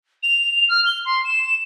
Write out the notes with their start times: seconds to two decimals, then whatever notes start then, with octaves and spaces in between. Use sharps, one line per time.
0.23 F7
0.69 F6
0.86 G7
1.05 C6
1.25 E7